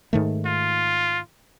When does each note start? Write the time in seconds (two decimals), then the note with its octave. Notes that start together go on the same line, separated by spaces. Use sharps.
0.13 G#2 D#3 A3
0.45 F4